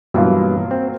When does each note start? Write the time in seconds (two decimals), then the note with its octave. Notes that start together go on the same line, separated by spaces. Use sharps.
0.14 G2 B2 E3 F#3 A#3 F4
0.71 C4